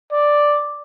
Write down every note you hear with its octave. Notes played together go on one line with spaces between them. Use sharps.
D5